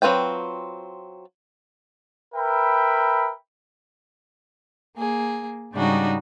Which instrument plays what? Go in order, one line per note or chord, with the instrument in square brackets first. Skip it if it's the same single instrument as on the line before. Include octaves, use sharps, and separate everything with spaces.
[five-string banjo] F#3 C4 F4 B4 G5
[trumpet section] A#4 B4 E5 G5 B5
[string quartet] A#3 G#4
G#2 C#3 G3 D4 D#4 F#4